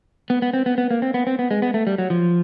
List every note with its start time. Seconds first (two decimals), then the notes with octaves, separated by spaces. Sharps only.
0.30 B3
0.42 B3
0.54 C4
0.66 B3
0.78 B3
0.91 A#3
1.02 C4
1.14 B3
1.27 C4
1.39 B3
1.51 G#3
1.62 B3
1.74 A3
1.87 G3
1.98 F#3
2.10 F3